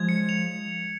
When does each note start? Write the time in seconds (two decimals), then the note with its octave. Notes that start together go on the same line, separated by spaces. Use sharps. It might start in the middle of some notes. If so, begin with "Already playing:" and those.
Already playing: F3 G#3 G#6
0.09 C#7
0.29 F7